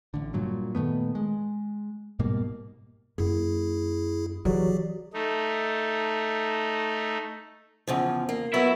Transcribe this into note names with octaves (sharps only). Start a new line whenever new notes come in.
A1 D3
G2 A#2 F#3
A#2 D#3 A3 B3
G#3
G#2 B2 G3 A#3
F#2 A#3 E4 G#4
E3 F#3 G4 G#4 D5
A3 D#4
E2 C#3 F3
A#3
F#3 B3 E4 A#4